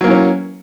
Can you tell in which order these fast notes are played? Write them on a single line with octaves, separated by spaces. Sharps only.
F#3 A#3 E3 C#4